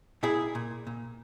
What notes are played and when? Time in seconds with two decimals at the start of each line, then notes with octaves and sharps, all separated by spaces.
0.23 A#2 E4 G#4
0.55 A#2
0.87 A#2